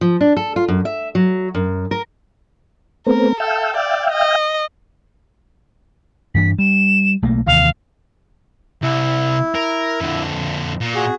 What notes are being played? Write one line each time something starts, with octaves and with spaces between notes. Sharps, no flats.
F3
D4
A4
F4
F#2
E5
F#3
F#2
A#4
A3 B3 C4 A#4
A4 E5 F5 G5
D5
D#5
G2 E3 D4 B6
G3 E7
B1 A3 A#3
D#2 C3 E3 F5
C2 E4
A#4
F2 D3
A#2
F#4 G#4